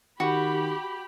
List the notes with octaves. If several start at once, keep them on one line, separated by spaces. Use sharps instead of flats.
D#3 F#4 G4 B5